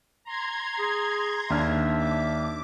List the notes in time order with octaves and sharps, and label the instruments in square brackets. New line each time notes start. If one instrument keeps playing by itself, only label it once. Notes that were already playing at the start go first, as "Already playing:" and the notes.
[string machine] A#5 C6 G#6
[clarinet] G#4
[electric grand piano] D#2 D4 F6 [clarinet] E5
[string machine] D6